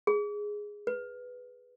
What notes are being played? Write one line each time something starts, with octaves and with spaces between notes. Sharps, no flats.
G#4
B4